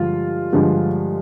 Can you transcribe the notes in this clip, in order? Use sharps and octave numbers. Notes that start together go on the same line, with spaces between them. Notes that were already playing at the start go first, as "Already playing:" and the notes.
Already playing: G2 D3 F3 G#3 F4
G2 D3 F3 G#3